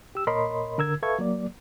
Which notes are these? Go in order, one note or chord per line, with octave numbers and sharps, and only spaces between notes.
G4 E6
A#2 A#4 C#5 D#5 B5 C6
D3 A#4 E6 G#6
A4 B4 E5 F5 C#6 G#6
F#3 A#3 D5